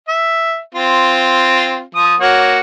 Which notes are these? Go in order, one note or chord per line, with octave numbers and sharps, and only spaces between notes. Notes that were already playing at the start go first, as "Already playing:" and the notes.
E5
C4 F4
F3 D#6
A#3 F#4 C#5